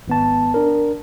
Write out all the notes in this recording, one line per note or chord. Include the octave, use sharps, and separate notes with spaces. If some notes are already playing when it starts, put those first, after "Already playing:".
G#1 B3 A5
D4 A#4